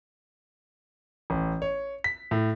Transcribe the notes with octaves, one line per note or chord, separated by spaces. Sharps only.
A1
C#5
B6
A2